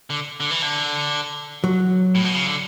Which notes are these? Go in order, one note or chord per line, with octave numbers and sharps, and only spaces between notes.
D3
D3
E3
D3
F#3
A2
B2
C#3
D3